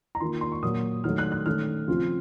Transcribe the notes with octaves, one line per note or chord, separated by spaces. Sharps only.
A#5
D#3 A#3 F4 C6
C6
C#6
A#2 F#3 A#3 D#6
D#3 F#3 A3 F6
F#6
F#6
D#3 A3 C#4 F6
C#3 F3 C4 F4